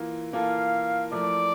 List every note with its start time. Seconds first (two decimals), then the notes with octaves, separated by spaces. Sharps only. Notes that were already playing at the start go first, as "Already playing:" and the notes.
Already playing: E3 A#3 F4
0.32 E3 A#3 F4 A4 F5
1.12 F3 A3 E4 A#4 D5